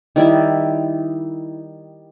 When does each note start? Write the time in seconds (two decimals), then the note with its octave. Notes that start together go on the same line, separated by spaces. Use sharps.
0.16 D#3 G3 E4